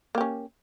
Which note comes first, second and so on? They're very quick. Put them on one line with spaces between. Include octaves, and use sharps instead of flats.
A#3 G4 C#4